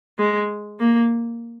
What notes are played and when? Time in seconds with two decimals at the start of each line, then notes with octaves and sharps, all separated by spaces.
0.18 G#3
0.80 A#3